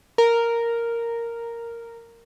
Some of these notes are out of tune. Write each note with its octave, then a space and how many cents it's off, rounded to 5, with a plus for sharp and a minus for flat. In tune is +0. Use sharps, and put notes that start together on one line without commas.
A#4 -5